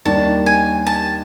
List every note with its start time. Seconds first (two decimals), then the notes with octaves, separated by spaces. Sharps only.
0.05 D#2 D#3 G3 A#3 D4 A5
0.46 G#5
0.87 A5